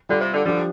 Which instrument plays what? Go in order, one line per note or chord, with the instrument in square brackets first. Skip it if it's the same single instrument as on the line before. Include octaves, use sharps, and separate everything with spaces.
[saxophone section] D3 [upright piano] G3 F4
[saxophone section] C3
D3
[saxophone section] D3 G3 [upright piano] F3 D4 G4